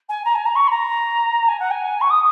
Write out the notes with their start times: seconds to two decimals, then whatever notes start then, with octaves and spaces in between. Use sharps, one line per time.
0.09 G#5
0.24 A#5
0.35 G#5
0.45 A#5
0.55 C#6
0.67 B5
0.70 A#5
1.48 G#5
1.59 F#5
1.70 G#5
2.01 C#6
2.10 D#6